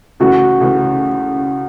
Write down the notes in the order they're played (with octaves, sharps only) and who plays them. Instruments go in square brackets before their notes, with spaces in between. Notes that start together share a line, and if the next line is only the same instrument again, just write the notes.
[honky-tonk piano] C#2 C#3 E3 A3 [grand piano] F#4
[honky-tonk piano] C#2 C#3 E3 A3